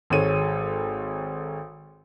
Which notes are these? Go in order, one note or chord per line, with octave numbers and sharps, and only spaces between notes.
G#1 G#3 A4 C#5 D#7